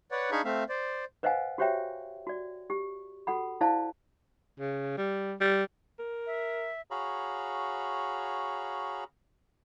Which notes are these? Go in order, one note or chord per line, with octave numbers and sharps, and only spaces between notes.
B4 C#5 D5 F#5
D4 D#4 G#4 F5 B5 C#6
A3 C4 E5 F5
C5 D5
B4 C5 D#5 F5 F#5 G#5
F#4 G4 C5 C#5 E5 G5
F#4 D5
G4
F#4 A4 F#5 B5
E4 C5 D5 F5 A5
C#3
G3
G3
A#4
E5
F#4 G#4 C#5 F5 A#5 B5